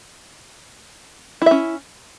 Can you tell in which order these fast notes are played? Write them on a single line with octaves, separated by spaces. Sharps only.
E4 E5 C#4